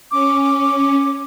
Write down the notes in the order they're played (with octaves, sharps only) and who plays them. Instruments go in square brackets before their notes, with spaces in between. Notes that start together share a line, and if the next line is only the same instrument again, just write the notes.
[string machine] C#4 [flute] D6